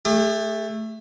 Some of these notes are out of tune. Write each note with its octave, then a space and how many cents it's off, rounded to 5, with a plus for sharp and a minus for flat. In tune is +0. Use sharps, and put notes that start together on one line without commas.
A3 +0 G#4 -45 D#6 -45